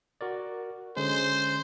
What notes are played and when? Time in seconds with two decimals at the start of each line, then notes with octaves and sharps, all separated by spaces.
0.21 F#4 A#4 D5
0.96 D3 G#3 C#4 C5